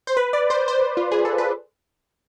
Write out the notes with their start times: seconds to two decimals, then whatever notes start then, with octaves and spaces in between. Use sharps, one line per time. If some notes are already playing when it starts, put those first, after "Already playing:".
0.07 C5
0.17 B4
0.33 D5
0.50 C5
0.68 C5
0.97 F4
1.12 G#4
1.25 A4
1.38 B4